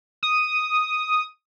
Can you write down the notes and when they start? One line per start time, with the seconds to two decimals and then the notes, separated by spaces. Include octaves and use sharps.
0.23 D#6